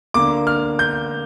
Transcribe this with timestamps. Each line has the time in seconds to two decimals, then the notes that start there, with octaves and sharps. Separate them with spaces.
0.14 D3 A#3 D6
0.47 F6
0.79 G6